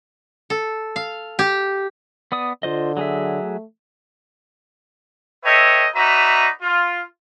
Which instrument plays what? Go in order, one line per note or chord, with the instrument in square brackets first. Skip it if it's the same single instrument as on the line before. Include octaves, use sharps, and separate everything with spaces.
[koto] A4
F5
G4
[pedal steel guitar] B3 D5 D#6
[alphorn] D3 [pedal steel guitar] F4 C5 D#5
[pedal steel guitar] F#3 G#4 E5
[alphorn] A3
[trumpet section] A4 B4 C#5 D#5 E5 G5
D#4 F#4 B4 D5 E5 A#5
F4